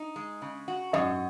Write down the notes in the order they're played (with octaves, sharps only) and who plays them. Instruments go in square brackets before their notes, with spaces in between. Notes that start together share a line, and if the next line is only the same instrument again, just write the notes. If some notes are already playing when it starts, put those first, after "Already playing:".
Already playing: [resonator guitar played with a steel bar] D#4
G#3
C#3
F#4
[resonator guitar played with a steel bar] F#2 [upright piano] D#5